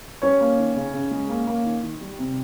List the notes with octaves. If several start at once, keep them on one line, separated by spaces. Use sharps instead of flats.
G3 C#4 C#5
A#3
D#3
C#3
C#3
G#3
A#3
A#3
D#3
D#3
G3
C3